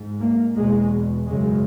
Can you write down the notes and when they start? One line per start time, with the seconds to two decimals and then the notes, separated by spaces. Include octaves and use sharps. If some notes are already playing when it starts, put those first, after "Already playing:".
Already playing: G#2
0.21 A#3
0.56 E2 B2 G#3
1.27 F#2 C#3 G#3